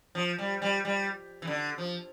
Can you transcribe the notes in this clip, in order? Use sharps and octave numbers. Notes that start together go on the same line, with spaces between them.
F3
G3
G3
G3
E3
D3
F3